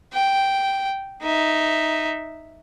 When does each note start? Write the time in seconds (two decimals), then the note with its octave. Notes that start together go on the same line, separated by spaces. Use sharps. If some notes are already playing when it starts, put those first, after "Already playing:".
0.13 G5
1.22 D#4 E5